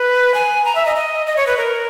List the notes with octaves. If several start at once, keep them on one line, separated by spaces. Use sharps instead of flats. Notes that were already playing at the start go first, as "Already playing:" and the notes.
Already playing: B4
G#5
A#5
E5
D#5
D#5
D#5
C#5
B4
A#4